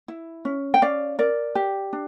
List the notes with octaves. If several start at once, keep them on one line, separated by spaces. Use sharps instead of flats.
E4
C#4
G5
C#4 D5 F5
A#4 D5
G4
D4